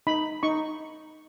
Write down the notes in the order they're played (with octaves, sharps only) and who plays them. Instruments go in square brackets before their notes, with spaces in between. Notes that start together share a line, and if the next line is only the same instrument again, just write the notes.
[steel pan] D#4 B5
D#4 C#6